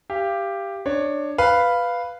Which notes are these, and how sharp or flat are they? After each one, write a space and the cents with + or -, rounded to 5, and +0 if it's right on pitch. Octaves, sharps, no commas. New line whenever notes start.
G4 +5 F5 -30
D4 +15 C#5 +0
B4 +0 F5 -5